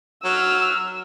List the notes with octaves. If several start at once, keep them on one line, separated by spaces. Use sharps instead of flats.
F#3 E6 F6